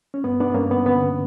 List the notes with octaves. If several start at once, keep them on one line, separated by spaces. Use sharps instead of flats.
C#4
G2 B3
B3 D4
G2 A#3 C#4
B3
D3 B3